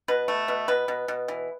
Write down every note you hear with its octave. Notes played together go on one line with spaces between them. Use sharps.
B2 B4
A3
B2
B2 B4
B2
B2
E3